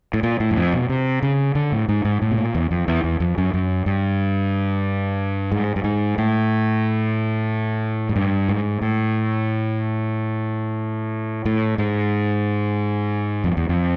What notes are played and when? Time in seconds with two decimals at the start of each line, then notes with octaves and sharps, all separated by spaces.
0.14 A2
0.23 A#2
0.40 A2
0.51 F#2
0.57 F2
0.74 B2
0.89 C3
1.23 C#3
1.55 D3
1.72 A2
1.89 G#2
2.05 G#2
2.22 A2
2.31 B2
2.38 A#2
2.55 E2
2.71 F2
2.88 E2
3.04 E2
3.20 F2
3.38 F#2
3.54 F#2
3.86 G2
5.52 G#2
5.76 G2
5.84 G#2
6.18 A2
8.09 G#2
8.16 G2
8.49 G#2
8.82 A2
11.46 A2
11.78 G#2
13.44 F2
13.57 E2
13.69 F2